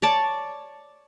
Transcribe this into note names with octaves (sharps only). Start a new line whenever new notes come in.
C#5 D5 A5